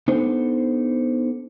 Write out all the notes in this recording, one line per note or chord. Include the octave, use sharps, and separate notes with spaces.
B3 D4 D#4 A4 C5